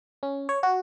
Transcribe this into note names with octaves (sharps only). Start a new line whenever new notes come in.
C#4
C#5
F#4